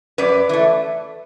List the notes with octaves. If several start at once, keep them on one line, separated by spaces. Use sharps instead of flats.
F#2 B4 D5
E3 A3